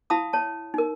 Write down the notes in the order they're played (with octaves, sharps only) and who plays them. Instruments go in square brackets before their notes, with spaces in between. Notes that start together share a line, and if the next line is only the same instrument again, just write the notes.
[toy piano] E4 F5 A5 B5 D#6
C#5 A5
D#4 A#4